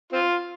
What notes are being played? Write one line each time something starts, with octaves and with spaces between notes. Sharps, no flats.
C4 F4